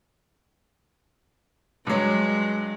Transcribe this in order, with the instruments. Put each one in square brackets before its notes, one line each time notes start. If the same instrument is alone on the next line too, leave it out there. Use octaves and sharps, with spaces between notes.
[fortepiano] G2 F#3 [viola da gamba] G#3